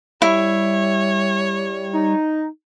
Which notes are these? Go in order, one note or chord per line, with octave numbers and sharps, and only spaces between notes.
G3 E4 C#5
D#4